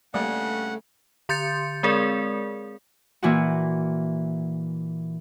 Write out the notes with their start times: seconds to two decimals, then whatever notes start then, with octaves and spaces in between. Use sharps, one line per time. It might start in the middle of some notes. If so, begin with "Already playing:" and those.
0.14 G2 C#3 G3 A3 A#3 D5 F#5
1.29 D3 C6 G6 A6 C#7
1.83 G#3 C4 G#4 A#4 D5
3.23 A#2 E3 E4 F#4